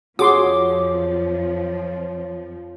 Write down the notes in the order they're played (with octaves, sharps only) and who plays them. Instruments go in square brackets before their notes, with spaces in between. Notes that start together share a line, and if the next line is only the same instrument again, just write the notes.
[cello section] F2 F3 [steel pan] F#4 G#4 C6 [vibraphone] C#5 [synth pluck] D6